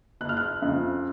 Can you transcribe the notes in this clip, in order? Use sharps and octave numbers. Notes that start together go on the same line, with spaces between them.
F#1 F#6
F6
F#6
F2 C#3